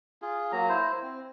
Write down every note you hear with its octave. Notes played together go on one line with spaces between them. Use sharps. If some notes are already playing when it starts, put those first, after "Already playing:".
F4 G#4
F#3 A#3 A#5
E4 C5
C4